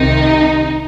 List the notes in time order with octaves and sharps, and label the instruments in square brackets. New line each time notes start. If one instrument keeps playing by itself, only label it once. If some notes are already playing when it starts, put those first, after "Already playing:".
Already playing: [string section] C2 C3 D#3 D#4